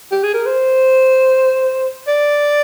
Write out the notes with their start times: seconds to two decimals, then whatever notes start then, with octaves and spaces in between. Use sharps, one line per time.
0.12 G4
0.23 G#4
0.34 A#4
0.46 C5
2.07 D5